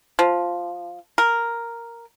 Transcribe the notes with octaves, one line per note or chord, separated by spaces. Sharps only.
F3
A#4